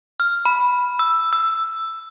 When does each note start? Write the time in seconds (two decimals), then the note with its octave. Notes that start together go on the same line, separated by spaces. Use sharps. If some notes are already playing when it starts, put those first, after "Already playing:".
0.20 F6
0.45 B5
0.99 E6
1.33 E6